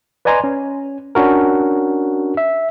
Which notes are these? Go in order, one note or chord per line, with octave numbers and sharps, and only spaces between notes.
B4 D5 D#5 G#5 A#5 C6
C#4
C#4 D4 F#4 A#4
E5